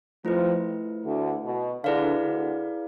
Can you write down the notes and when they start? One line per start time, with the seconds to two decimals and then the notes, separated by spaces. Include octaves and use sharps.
0.25 F2 F3 A3 E4 B4
1.05 D2 D3
1.44 B2
1.84 D2 D3 E4 G#4 B4 D5 F5
2.24 D2 D3